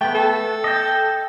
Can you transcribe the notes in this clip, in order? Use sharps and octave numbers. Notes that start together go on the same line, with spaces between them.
A3 B3 G5
A4
D#5 G5